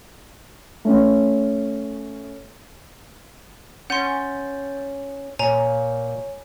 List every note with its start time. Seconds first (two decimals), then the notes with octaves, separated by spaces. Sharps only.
0.85 A3 C#4
3.90 C#4 C#5 F#5 C6 G6 A6
5.39 A#2 C#5 G#5 A#5